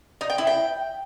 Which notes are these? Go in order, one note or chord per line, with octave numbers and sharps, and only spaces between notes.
D#4
G5
E4
G5